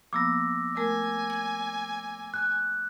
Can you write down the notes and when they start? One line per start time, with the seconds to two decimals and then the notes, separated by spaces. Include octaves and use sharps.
0.13 F3 A#3 B3 D6 E6 A#6
0.77 A3 A#4 G#5
1.30 G#6
2.34 F#6